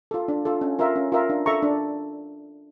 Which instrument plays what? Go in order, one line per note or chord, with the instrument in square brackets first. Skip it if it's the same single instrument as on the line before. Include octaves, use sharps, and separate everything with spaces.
[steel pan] F4 A4
D4
F4 A4
C#4
F4 A#4 E5
C#4
F4 A#4 E5
D4
A4 E5 A#5 C#6
D4